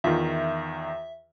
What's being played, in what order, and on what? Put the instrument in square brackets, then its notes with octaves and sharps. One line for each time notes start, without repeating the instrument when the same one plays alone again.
[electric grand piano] E2 D#3 [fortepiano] F4 [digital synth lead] E5